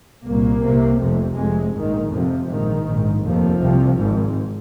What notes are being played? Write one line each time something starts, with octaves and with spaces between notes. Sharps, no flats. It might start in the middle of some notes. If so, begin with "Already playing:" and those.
C2 A#2 A#3
C2 C3
F1 F2 C3
F1 F2 C3 G#3
A#1 G#2 D#3
F1 F2 C3 F3
A#1 G#2 D#3
A#1 G#2
F1 D#2 F3
C2 C3
G#1 G#2